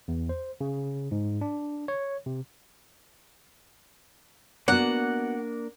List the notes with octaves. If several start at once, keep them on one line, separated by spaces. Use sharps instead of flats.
E2
C5
C#3
G#2
D4
C#5
C3
A#3 B3 D4 F#4 A#4 F#5